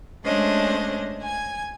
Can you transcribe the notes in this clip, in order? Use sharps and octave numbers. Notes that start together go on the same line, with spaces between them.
G#3 A3 C#4 D4 C5 D#5
G#5 G#6